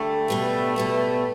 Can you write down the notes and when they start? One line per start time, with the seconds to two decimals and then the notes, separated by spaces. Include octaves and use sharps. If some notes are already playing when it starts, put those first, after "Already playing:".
Already playing: D3 G3 A3
0.28 B2 G3 B3
0.76 B2 G3 B3